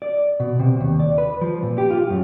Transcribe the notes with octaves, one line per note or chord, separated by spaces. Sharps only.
D5
B2
C3
D#2
D5
B4
F3
A#2
G4
F4
F#2